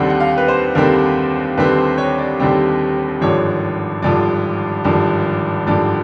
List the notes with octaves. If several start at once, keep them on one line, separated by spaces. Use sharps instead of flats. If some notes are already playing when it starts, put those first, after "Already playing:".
Already playing: D#2 D3 G3 C4 F#5
F#5
F5
B4
C5
D#2 D3 G3 C4 A#4
D#2 D3 G3 C4 B4
C5
C#5
D5
D#2 D3 G3 C4
G#1 G2 D3 F3 C#5
G#1 G2 D3 F3 D5
G#1 G2 D3 F3
G#1 G2 D3 F3 D5